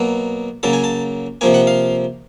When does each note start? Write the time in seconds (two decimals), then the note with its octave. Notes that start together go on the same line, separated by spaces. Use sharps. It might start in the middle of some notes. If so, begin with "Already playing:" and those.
Already playing: B2 F#3 A#3
0.63 C#3 F#3 A#3 A5
0.73 G#5
0.84 A5
1.41 C3 F3 A#3 G#5
1.54 F#5
1.67 F5